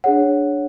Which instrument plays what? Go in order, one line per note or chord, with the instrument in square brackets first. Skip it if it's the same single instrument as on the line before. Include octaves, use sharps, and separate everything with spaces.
[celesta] D4 G#4 C#5 F#5